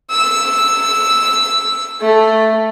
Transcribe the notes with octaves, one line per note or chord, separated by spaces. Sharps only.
E6
A3